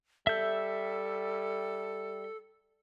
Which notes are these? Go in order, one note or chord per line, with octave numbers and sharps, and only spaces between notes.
G3 A4 E5 G6